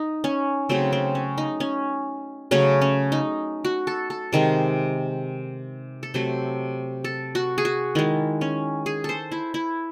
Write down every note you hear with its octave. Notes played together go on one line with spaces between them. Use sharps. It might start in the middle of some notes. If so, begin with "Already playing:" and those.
Already playing: D#4
C#4
C#3 F#3 A3 C4
C4
C#4
D#4
C#4
C#3 F#3 A3 C#4
C#4
D#4
F#4
A4
A4
C3 D#3 G#3
A4
C3 F#3 A3 C5
A4
F#4
G#4
F#4
D#3 G#3 E4
C#4
G#4
A4 C5
E4
E4